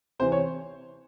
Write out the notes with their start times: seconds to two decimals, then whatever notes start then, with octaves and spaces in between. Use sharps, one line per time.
0.19 C3 E3 C5
0.32 C#5